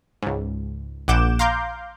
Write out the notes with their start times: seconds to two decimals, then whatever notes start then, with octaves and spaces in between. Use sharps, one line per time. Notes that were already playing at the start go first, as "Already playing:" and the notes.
0.22 C#2 G#2
1.08 A#1 F#5 D6 G6 E7
1.39 F5 A#5 C6 D6 G6